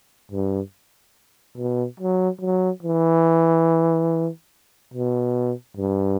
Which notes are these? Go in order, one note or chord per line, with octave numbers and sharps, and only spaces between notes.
G2
B2
F#3
F#3
E3
B2
G2